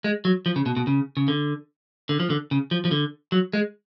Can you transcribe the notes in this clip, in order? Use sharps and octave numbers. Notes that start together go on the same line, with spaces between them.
G#3
F#3
F3
C#3
B2
B2
C#3
C#3
D3
D3
F3
D3
C#3
F3
F3
D3
F#3
G#3